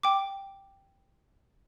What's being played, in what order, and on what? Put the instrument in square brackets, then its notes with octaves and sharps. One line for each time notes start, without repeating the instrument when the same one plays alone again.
[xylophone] G5 D6